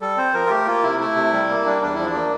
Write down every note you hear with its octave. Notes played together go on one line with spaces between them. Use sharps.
G3 A4
C4 C5
F3 A#4
F4
A3 G4
A#3 F4
C3 E4
A3 E4
C3
G3
A#3
G3 D4
E2 D4
E4
F3
D4
A#3